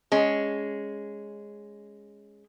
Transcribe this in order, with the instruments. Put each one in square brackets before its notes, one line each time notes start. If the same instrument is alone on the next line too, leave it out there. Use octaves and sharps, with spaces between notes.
[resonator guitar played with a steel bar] G#3 C#4